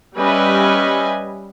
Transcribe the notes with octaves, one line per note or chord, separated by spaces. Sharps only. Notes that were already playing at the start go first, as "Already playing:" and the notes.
G3 C#4 B4 D#5 E5 G#5